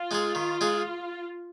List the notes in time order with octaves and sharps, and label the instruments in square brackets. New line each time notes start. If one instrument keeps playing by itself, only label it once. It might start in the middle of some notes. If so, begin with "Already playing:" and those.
Already playing: [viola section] F4
[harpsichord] G#3 D#4 G#4
D#3
G#3 D#4 G#4